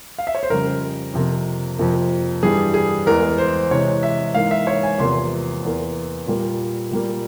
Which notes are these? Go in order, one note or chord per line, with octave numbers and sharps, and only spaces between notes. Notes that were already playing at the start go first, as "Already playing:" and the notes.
F5
E5
C#5
C5
F2 C#3 G3 A#4
F2 C3 F3 A#3
F2 C3 F3 A#3
G2 E3 G3 G#4
G#4
E2 E3 G#3 A#4
C5
C3 E3 G#3 C#5
E5
G#2 E3 A#3 F5
E5
C#5
G#5
E2 C3 F3 A#3 C6
E2 E3 A#3
A#2 G3 A#3
A#2 G3 A#3